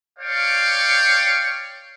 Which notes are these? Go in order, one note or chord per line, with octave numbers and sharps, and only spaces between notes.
C#5 D5 F5 G5